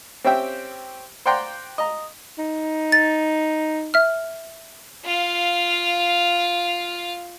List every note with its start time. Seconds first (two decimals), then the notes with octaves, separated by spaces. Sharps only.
0.24 C4 C#4 G4 E5 G5
1.26 C5 D5 F#5 G5 A#5 C6
1.78 D#5 A#5
2.38 D#4
2.92 A6
3.94 E5 F6
5.05 F4 F5